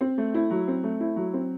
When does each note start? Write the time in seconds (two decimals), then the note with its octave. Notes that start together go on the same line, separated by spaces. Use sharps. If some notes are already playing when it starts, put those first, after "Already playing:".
0.01 C4
0.18 A3
0.34 E4
0.50 F#3
0.68 C4
0.84 A3
1.00 E4
1.16 F#3
1.34 C4